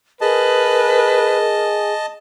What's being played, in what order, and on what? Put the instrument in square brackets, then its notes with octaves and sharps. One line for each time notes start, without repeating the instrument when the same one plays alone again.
[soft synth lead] G#4 [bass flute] A#4 [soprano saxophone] B4 [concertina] D#5 A5